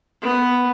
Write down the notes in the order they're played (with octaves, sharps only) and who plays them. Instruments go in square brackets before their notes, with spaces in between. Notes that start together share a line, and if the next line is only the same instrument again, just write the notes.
[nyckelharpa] B3